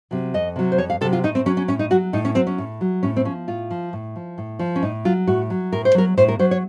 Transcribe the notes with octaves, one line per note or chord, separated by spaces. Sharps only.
C3 F#3
F2 D#5
C3 F#3
C5
F2 C#5
F5
C3 F#3 A4
F4
A2 D#4
C4
F#3 C#4
C#4
A2 C#4
D#4
F#3 F#4
A2 D#4
C#4
F#3 C4
C#4
A2
F#3
A2 C#4
C4
F3 C#4
A2 F4
F3
A2
F3
A2
F3
C#4
A2 D#4
F#3 F4
A2 F#4
F#3
A2 A#4
C5
F#3 A#4
A2 C5
A#4
F#3 C5
C#5